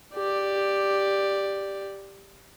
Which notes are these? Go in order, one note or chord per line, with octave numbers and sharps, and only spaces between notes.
G4 D5